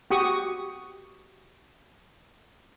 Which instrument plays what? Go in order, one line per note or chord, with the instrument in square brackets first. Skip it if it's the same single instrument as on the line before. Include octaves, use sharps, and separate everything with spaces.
[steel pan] F#4 G4 C#6 D#6